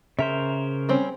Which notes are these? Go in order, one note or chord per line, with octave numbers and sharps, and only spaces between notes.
C#3 A#4 C5 E5
G3 C4 C#4